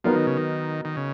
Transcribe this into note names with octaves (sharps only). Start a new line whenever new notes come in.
F3 F#3 B3 D#4 A#4 D#5
D#3
C#3
D#3
D#3
C#3